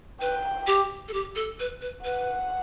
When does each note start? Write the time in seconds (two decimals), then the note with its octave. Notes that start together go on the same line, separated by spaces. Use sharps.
0.21 B4 G5
0.67 G4
1.08 A4
1.13 G4
1.36 A4
1.60 B4
1.81 B4
2.04 B4 F#5